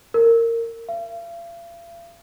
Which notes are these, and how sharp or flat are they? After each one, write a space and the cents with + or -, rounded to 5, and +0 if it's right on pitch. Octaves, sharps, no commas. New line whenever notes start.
A#4 -20
F5 -45